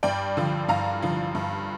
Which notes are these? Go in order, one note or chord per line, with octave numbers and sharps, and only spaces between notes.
G2 D5 G5
D3 F3
G2 F5 A#5
D3 F3
G2